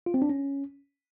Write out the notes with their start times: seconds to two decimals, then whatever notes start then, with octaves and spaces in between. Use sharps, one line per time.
0.06 F4
0.14 C4
0.22 D4
0.30 C#4